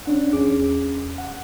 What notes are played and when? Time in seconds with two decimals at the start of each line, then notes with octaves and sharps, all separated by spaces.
0.05 C#4 D4 F#5
0.33 E2 C#4 G#4 D6
1.18 F#5